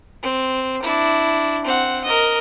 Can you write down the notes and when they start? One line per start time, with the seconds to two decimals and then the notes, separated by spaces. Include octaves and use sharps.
0.23 C4
0.82 D4 E4
1.65 C4 F#5
2.04 A#4 D#5